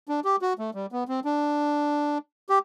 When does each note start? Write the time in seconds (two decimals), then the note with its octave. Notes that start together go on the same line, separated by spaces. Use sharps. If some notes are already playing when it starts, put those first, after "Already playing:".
0.08 D4
0.25 G4
0.42 F#4
0.59 A3
0.75 G3
0.92 B3
1.08 C4
1.25 D4
2.49 G4